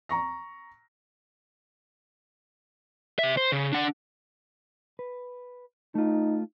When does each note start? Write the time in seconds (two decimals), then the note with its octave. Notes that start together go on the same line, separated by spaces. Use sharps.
0.09 A#5 C#6 A#6
3.19 C3 E5
3.37 C5
3.52 C#3
3.73 D4 F#5
4.99 B4
5.95 A3 D#4 F4